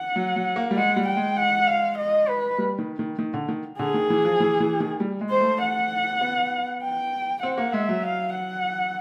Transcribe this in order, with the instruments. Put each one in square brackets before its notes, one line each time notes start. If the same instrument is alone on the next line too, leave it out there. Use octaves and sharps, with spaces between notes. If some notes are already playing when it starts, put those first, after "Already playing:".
Already playing: [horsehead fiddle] F#5
[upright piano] F#3
F#3
A#3
G3
[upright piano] G#3 [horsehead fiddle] F#5
[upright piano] G3
[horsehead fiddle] G5
[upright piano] G#3
[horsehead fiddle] F#5
F5
D#5
B4
[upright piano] G3
D#3
D#3
D#3
D3
D#3
[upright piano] D3 [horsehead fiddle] G#4
[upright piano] D#3
E3
F3
E3
E3
D#3
G3
G#3
[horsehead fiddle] C5
[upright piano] A3
[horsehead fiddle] F#5
[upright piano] B3
[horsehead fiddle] G5
[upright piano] C4 [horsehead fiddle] F#5
[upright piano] A#3
[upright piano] G#3 [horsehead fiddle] E5
[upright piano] F#3
[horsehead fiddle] F5
F#5